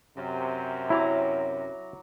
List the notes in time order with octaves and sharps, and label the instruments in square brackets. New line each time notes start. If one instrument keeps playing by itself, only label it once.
[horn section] F#2 C3
[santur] F#3 A#5 D6 [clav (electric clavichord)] E4